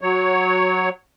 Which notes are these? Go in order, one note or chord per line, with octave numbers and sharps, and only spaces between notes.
F#3 C#5